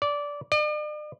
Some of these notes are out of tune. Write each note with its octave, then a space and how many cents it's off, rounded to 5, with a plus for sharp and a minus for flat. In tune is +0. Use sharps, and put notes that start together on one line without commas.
D5 -15
D5 +45